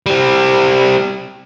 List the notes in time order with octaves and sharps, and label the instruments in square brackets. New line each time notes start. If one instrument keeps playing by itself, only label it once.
[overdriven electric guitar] G3 C4